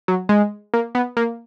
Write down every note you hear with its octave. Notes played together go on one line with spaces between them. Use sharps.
F#3
G#3
A#3
B3
A#3